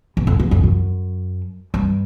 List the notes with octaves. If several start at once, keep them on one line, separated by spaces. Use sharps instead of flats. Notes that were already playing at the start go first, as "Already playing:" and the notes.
E2
F2
E2
F2
F#2
G2